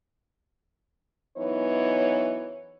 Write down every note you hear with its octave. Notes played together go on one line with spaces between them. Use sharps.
F#2 E3 B3 D#4 C#5